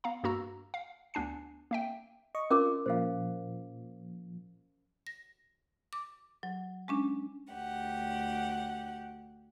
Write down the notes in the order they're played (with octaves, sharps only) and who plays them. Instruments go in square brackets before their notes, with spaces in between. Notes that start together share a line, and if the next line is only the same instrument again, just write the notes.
[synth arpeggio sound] B3 F5 A#5
G2 A#3 F#4 A#5 E6
F5
D2 B3 D4 G#5 C7
A#3 E5 G5
[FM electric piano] D#5 C#6
[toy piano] C#4 A#4 D6 [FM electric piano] F4
[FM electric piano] A#2 F3 [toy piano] C5 F5
[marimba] A#6
D6
F#3
G#3 C#4 D4
[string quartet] D2 G4 F#5